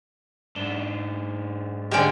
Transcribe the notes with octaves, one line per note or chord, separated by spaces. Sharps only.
G#2 D4 E7 G7
D3 G#3 A#3 G4 D5 D#5 G#5